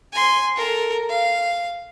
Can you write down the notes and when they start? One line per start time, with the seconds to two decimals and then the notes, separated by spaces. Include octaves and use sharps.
0.13 G#5 C6
0.56 A4 A#4
1.09 F5